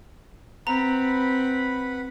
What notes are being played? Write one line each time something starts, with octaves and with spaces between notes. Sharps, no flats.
C4 B4 F#5 A#5 B5